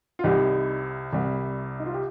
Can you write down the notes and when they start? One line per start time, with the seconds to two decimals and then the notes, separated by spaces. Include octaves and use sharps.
0.19 F4
0.24 C2 C3 G3 D#4 G4
1.13 C2 C3 G3
1.80 D#4
1.86 F4
1.94 G4